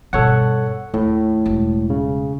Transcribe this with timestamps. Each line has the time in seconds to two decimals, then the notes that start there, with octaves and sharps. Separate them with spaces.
0.13 G2 B2 A4 C#5 F#5
0.94 D#2 A2
1.46 E1
1.90 C#3